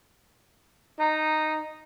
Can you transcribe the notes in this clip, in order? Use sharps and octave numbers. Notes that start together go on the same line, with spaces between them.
D#4